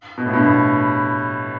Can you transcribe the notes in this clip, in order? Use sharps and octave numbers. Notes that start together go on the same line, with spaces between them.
B2
A2
G2 B2
A2